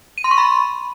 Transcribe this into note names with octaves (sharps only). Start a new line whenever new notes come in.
D#7
C6
C#6
B5